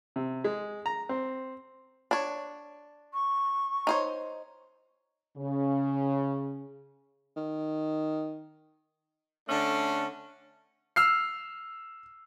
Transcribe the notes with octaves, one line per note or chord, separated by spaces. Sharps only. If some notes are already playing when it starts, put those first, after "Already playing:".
C3
G#3
A#5
C4
D4 C#5
C#6
D#4 C5 C#5
C#3
D#3
D3 A3 C#4 D4
E6 F6 C7